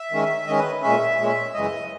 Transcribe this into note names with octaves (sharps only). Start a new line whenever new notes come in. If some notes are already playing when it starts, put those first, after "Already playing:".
Already playing: E5
D#3 G#3 C#4
D#3 G#3 C#4 D#5
B4
A#2 G#3 C#4 E5
A#2 G#3 C#4
F#2 C#3 E3 G#3 D#5